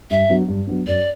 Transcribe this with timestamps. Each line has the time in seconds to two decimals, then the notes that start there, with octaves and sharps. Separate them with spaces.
0.10 G2 E5
0.29 F#3 B3 D4
0.48 G2
0.67 F#3 B3 D4
0.87 F#2 D5